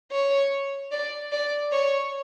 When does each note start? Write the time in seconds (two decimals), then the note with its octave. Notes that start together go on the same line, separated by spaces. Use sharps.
0.12 C#5
0.92 D5
1.32 D5
1.72 C#5